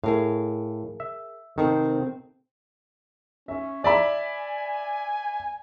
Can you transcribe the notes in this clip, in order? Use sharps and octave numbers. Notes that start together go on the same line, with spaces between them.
A2 G#4 A#4 F5
E5
C3 D#3 C4 A4
C#4 E5
D5 E5 G#5 B5